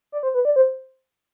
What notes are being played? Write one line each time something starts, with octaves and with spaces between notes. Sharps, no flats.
D5
C5
B4
D5
C5